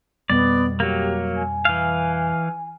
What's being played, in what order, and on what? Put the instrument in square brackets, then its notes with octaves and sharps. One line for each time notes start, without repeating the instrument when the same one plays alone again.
[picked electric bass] F2 B2 G3 [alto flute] B3 [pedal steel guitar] D5
[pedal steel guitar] F#3 A#3 [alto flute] G4
[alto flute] G#5
[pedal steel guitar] E3 F5